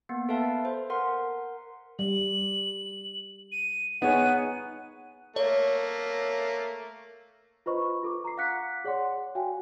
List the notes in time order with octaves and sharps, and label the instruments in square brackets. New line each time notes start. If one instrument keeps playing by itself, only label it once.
[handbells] A#3 B3
A4 B4 E5 F5 A5
C5
A#4 F#5 C6
[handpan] G3 [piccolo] F#7
[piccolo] D#7
[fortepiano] B3 C#5 [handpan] D#4 G#4 [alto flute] F#5 [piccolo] D#7
[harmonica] A3 A#3 [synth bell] C#5
[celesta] F4 B4 C5 D#5 B5 C#6
F4 A4 D6
A#5 C7
F5 F#5 D6 F#6 B6 C#7
G#4 C#5 D5 F#5 C6
F#4 F5 G5 G#5